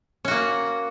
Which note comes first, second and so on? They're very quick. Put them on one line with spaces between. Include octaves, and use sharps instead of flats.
C#4 F#4 A#3